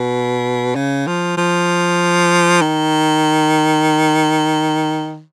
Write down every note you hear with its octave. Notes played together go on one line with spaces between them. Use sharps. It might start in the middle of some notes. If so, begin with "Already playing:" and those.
Already playing: B2
C#3
F3
F3
D#3